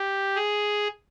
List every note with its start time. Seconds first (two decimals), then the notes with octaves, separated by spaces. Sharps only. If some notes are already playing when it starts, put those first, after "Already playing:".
Already playing: G4
0.36 G#4